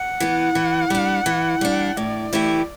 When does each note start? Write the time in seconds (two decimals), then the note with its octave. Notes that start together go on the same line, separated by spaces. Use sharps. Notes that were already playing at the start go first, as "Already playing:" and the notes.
Already playing: F#5
0.20 E3 B3
0.55 E3
0.90 G3 D4
1.26 E3
1.61 G3 D4
1.97 A2 D5
2.33 E3 A3 E4 G4